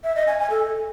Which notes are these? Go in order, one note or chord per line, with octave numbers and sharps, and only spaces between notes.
E5
D#5
G#5
G#5
A4